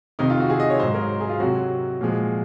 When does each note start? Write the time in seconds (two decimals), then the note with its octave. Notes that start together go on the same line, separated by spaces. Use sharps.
0.19 F2 C3 D#3 D#4
0.30 F4
0.40 F#4
0.50 G#4
0.60 D#5
0.70 C#5
0.80 G#2 F#3 C5
0.94 A#4
1.20 G#4
1.29 F4
1.40 C3 F#3 F#4
2.01 A#2 F3 G#3